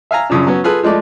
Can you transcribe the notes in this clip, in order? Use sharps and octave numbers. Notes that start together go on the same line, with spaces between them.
E5 F5 G#5 A#5
F#2 C#3 F3 D4
F#3 B3 C#4
F4 G#4 A4 B4
F3 G#3 A3 D5